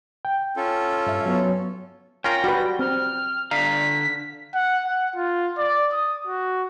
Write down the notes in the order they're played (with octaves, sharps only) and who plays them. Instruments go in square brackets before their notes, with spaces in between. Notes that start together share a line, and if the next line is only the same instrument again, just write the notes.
[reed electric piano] G5
[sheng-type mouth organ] C#4 F4 A4
[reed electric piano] G2 E5
F#3 B3 C#5
[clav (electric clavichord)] C#4 F4 A#4 [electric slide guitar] G5 [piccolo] A#6
[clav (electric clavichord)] G3 [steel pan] F#4 B4
[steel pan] C4 [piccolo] F6
[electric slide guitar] D3 D5 A#5 [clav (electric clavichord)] F5 [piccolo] B6
[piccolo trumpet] F#5
F#5
F4
D5
D#6
F#4